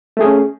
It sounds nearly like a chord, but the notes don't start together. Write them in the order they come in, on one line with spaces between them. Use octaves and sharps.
A3 G#4 C#4